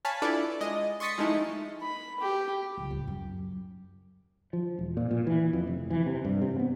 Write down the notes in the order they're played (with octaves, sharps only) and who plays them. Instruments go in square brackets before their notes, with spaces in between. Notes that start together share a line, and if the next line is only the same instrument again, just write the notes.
[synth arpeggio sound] C#5 F5 G#5 A5 B5
D4 E4 F4 A4 B4 D5
G#3 D#5
C6 C#6 D#6 A6 B6 C#7
F3 G#3 A3 D#4 E4
[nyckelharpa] B5
G4
[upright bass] C#2
D1
F#2
[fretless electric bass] F3
E1
A#2
A#2
E3
F2
F1
E3
C3
G2
C3
B3